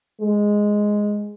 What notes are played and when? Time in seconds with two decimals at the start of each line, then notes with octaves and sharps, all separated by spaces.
0.21 G#3